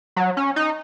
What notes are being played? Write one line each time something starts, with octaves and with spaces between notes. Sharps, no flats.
F#3
C#4
D#4